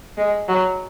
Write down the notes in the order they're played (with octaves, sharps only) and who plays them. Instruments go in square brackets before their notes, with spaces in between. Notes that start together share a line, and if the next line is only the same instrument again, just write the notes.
[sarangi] G#3
F#3